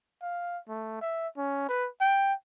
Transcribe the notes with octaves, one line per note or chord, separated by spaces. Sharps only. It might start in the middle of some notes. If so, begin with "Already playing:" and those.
F5
A3
E5
C#4
B4
G5